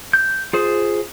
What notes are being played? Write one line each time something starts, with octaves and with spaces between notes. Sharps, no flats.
G6
F4 G#4 C5